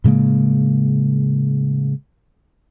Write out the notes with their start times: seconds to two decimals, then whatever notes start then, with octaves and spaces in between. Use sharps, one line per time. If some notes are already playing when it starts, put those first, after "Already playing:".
0.04 A2 C#3 G#3 A#3